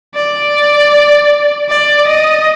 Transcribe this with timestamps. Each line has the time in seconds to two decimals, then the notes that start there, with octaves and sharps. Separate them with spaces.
0.15 D5
1.69 D5
2.08 D#5